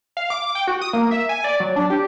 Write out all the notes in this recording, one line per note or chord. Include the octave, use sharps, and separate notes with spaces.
F5
D6
G5
F#4
D#6
A#3
E5
G#5
D5
F#3
D4
G4